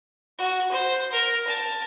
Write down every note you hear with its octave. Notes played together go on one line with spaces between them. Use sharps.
F#4
C5
A#4
A5